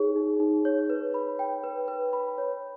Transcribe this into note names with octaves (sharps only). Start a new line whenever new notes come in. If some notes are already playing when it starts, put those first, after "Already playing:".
Already playing: D#4 G#4 C#5
D#4
D#4
C#5
B4
B5
G5
B4
B4
B5
C#5